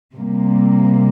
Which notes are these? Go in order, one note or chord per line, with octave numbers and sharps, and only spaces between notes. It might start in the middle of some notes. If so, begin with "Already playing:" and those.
C3 G3 A#3